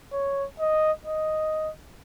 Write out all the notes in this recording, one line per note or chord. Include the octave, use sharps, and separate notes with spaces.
C#5
D#5
D#5